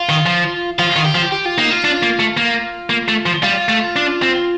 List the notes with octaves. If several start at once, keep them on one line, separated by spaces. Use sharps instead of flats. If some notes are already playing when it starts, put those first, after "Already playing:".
Already playing: F4
D#3
F3
F3 F4
D#3
G4
F3
G4
F4
A#3 D#4
F4
D4
A#3
A3
A#3
A#3
A3
F3
G3 F4
A3
D4
C4